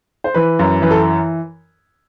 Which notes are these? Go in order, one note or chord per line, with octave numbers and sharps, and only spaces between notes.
C5
E3 B4
F#2
E3 B4
A4